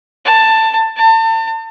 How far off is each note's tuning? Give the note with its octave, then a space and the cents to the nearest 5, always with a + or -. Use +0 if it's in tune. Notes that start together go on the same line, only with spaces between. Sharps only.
A5 +15
A5 +35